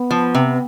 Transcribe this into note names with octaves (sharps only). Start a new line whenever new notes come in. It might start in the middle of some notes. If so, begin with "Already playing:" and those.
Already playing: B3
F3
C3